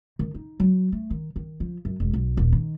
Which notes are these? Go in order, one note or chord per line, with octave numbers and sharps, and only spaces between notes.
D#3
D#4
F#3
A3
D#3
D#3
F3
F#2
E1
B1
D#1
D#3